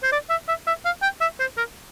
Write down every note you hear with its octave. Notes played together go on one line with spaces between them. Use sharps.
C5
D5
E5
E5
E5
F5
G5
E5
C5
A#4